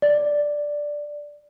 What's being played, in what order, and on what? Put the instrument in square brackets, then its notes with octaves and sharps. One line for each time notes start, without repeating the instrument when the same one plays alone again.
[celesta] D5